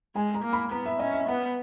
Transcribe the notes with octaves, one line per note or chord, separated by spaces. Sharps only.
G#3 G#5
A#5
A#3
B5
B3 A#5
E5
C#4 D#5
E5
B3 F#5